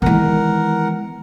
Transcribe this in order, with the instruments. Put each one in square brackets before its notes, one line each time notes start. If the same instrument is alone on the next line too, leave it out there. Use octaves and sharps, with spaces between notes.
[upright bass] D#3 E3 [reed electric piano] G#3 B3 [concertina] A#4 F#5